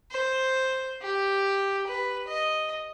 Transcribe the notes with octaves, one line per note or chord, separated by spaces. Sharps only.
C5
G4
B4
D#5